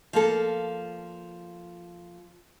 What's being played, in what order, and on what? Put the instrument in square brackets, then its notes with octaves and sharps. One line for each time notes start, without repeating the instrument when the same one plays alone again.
[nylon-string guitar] F3 A#3 A4